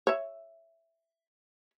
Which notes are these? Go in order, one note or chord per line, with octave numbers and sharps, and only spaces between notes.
C#5 E5